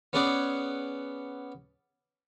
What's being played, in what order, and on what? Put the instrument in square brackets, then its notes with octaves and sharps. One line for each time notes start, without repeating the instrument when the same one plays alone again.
[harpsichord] B3 C#4 G#4 D5 F#5